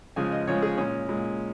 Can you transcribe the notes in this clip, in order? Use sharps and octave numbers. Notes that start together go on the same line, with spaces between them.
C#3 F3 G#3 G#5
D#5
C#3 F3 G#3 C#5
G#4
A#2 G#3 C#4
A#2 G#3